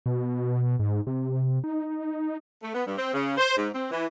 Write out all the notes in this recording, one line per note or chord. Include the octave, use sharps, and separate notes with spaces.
B2
G#2
C3
D#4
A3
B3
G2
C4
C#3
C5
G#2
C4
E3